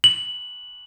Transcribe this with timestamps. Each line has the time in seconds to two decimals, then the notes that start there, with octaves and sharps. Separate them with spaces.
0.04 F#7